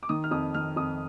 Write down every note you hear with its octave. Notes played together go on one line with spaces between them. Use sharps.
D6
D#3 D#6
F6
F2 D#6
D#3 F6
F2 D#6